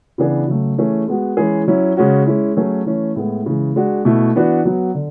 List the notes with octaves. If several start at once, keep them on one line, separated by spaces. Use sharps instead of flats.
C#3 E3 B3 D4 G#4
C#3 F#3 A3
E3 A3 C#4 G#4
G#3 B3 F#4
E3 G#3 C#4 E4 G#4
F#3 C#4 E4
C#3 G#3 C#4 F#4
G#3 C#4 E4
F#3 A3 C#4 G#4
E3 A3 C#4
A2 G#3 B3 E4
C#3 E3 G#3
G#3 D4 F#4
B2 A3 E4
E3 B3 D4 F#4
F#3 B3 F#4
D3